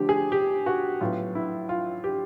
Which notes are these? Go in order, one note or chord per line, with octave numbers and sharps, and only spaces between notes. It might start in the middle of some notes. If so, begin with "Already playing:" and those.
Already playing: D3 F3 A3 G4
G#4
G4
F#4
A2 F#3 B3 F4
E4
F4
G4